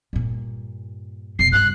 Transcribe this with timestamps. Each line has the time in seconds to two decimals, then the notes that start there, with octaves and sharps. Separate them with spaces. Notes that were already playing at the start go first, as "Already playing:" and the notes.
0.13 G2 A#2
1.39 F1 B2 C7
1.52 G2 C#3 F#6